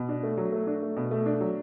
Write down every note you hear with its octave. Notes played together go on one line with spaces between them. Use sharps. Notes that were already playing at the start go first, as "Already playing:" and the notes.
Already playing: B2
D4
A3
F#3
A3
D4
A3
B2
A3
D4
F#3